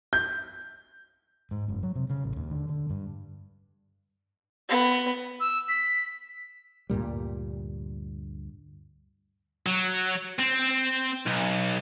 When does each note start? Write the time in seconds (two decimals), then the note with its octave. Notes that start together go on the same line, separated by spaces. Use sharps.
0.13 G6
1.51 G#2
1.68 F#1
1.83 F#3
1.96 C3
2.10 C#3
2.24 A1
2.36 D#2
2.51 D3
2.69 D3
2.90 G2
4.69 B3
5.40 E6
5.69 B6
6.90 D2 G2 A#2 G3
9.66 F#3
10.39 C4
11.26 B1